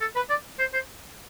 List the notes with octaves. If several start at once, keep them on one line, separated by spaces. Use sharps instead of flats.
A4
B4
D5
C5
C5